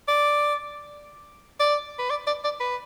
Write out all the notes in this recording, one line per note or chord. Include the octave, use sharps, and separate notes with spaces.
D5
D5
B4
D5
D5
D5
B4